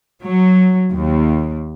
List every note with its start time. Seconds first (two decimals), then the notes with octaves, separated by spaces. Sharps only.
0.23 F#3
0.93 D#2